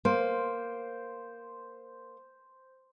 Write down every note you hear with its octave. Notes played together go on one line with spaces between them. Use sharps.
A#3 C5